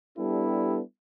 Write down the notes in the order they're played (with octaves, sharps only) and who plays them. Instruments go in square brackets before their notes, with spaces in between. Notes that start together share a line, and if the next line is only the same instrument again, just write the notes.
[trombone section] G3 B3 D4 E4 G4 A4